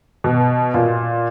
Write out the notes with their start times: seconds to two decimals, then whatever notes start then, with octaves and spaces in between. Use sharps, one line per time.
0.24 B2
0.74 A#2